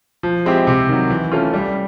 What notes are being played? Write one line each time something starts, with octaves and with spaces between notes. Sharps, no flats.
F3
G#3 C4 E4 G4
C3
D#3 F#3
E3
A3 C#4 F4
G3